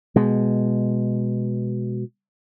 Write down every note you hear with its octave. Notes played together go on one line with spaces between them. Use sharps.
B2 G#3